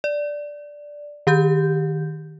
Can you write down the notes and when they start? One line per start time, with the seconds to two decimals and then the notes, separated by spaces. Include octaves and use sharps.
0.04 D5
1.27 D#3 G4 G6